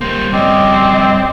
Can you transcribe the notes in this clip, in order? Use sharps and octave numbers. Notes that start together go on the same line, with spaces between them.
G3 A#3 C5
G2 C4 C#4 D5 D#5